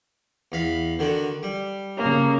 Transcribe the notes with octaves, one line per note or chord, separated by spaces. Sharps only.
E2 F5 B5
D3 D#3 F#4
G3
C#3 A#3